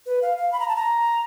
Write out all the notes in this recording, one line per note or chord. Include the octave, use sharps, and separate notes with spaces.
B4
F5
F5
B5
A#5
A5
A#5